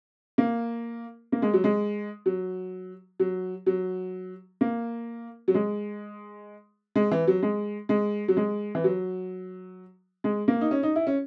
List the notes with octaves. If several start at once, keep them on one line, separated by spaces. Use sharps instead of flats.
A#3
A#3
G#3
F#3
G#3
F#3
F#3
F#3
A#3
F#3
G#3
G#3
E3
F#3
G#3
G#3
F#3
G#3
E3
F#3
G#3
A#3
D#4
C#4
D#4
E4
C#4